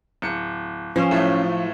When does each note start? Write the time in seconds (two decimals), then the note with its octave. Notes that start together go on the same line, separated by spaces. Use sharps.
0.22 D1 C#7
0.96 F3 C#4
1.11 B1 A2 A3